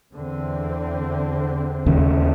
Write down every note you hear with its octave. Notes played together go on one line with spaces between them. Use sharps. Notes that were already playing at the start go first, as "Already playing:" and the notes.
E2 D3 C4
D#2 C#3